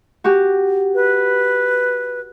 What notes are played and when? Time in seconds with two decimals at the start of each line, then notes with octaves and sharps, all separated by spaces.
0.24 F#4 G4
0.95 B4